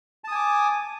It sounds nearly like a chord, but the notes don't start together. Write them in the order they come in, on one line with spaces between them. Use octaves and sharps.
A5 D#6 G#5 D6